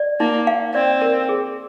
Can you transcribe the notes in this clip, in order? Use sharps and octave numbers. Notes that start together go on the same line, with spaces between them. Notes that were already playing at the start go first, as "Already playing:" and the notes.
Already playing: D5
A#3 D#4
F5
C4 D5
A#4
G#4